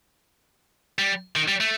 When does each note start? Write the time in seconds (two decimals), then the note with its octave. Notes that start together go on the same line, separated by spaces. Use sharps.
0.99 G3
1.36 D#3
1.48 G3
1.61 A3